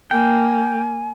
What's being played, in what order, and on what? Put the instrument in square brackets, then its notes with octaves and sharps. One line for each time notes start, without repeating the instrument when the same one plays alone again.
[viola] A#3 [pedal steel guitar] G5 [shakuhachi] G#5